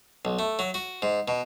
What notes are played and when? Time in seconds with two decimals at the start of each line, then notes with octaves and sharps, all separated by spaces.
0.25 B1
0.39 A3
0.59 F#3
0.74 F#4
1.02 G#2
1.28 B2